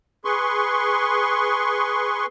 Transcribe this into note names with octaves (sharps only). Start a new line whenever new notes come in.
G#4 B4 C6 C#6